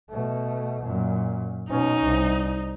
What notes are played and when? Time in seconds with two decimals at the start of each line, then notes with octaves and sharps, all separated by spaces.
0.10 B2 A3
0.82 F#2 A#2
1.70 B2 C#4 D#4
2.03 C2